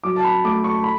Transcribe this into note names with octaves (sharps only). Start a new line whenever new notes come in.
F#3 D6
A5
B5
A3 D6
C#6
B5